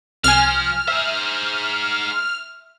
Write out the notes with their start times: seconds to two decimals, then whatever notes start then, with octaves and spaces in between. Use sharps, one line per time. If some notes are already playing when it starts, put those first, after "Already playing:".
0.24 C2 F3 G#5 F6
0.88 G#4 C5 E5